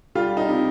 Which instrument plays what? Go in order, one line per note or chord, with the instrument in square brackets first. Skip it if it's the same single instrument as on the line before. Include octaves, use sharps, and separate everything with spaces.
[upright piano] G3 F4
D#4
C3